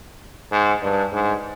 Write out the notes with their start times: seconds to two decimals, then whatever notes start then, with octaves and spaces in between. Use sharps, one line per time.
0.52 G#2
0.82 G2
1.13 G#2